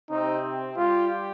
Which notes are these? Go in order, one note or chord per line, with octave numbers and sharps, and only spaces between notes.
C3 C4 D#4
G3 F4 G4